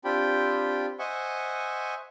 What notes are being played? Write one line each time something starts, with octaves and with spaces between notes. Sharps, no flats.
C4 D4 F4 G4 G5 B5
C5 D#5 E5 F#5 G#5 C#6